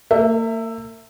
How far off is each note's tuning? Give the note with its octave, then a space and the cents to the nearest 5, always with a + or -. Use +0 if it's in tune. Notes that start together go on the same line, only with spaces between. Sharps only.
A#3 -40 E5 +5